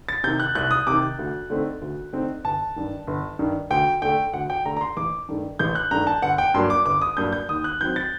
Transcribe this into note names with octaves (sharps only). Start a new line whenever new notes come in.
A6
C3 D#3 G6
F#6
C2 F#6
D#6
C3 D#3 D6
D2
D3 A3 C4 D#4
D2
D3 A3 C4 D#4
G1 A5
G2 D#3
G1
G2 D#3
D2 G5
D3 A3 G5
D2 F#5
G5
D3 A3 A#5
A#5
C6
A1 D6
G2 D#3 A3
A1 G6
F#6
G2 D#3 A3 A#5
A5
G1 F#5
G5
G2 F#3 A#3 D4 C6
D6
G1 D6
D#6
G2 F#3 A#3 D4 G6
G6
D#2 D#6
F#6
D#3 F#3 C4 G6
A6